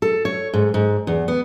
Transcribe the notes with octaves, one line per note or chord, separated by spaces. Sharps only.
A4
C#5
G#2
G#2
E2
B3